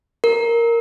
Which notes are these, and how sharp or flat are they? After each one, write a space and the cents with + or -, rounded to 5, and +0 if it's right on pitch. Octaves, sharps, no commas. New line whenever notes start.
A#4 -5